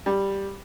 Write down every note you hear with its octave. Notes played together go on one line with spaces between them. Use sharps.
G3